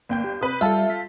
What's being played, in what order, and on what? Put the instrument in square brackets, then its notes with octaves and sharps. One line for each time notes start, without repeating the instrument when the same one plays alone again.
[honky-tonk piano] G1 G5 G6 [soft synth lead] A#3
[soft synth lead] G4
[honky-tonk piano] C3 B4 [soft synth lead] D#6
[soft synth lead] G3 [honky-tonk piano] F4 A4 [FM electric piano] E5 A5
[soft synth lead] B6